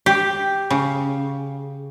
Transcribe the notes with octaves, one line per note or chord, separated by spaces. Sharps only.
G4
C#3